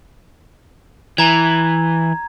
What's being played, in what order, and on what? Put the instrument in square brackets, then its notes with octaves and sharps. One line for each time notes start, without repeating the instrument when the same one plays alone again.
[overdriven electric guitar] E3 [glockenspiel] A#5 G#6